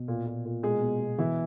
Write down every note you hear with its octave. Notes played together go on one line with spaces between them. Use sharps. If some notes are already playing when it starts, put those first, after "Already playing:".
Already playing: B2
A#2
A#2
A#2
B2 G#3 G#4
B2
B2
B2 E3 E4